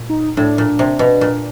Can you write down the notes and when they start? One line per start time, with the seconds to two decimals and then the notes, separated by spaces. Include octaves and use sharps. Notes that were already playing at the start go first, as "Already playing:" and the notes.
Already playing: A#2
0.10 D#4
0.37 A2 D4
0.58 A#2
0.79 C3
0.99 B2
1.21 A#2